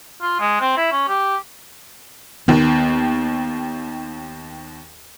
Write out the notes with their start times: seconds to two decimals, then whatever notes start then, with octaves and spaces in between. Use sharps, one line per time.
0.22 F4
0.40 G#3
0.61 C4
0.77 E4
0.92 C#4
1.08 G4
2.48 D#2 D#3 B3